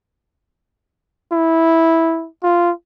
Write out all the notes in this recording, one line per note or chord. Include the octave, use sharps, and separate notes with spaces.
E4
F4